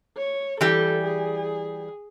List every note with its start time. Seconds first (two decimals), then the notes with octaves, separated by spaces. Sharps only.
0.17 C#5
0.61 E3 G3 G4 A4
1.04 G#4